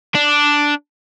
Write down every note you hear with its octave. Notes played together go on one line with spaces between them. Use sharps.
D4